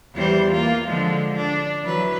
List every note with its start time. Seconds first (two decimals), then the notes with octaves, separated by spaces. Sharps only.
0.15 E2 G3 C5
0.51 A#3 F4
0.87 D3 F3 G#3
1.36 D4
1.83 E3 F#3 B4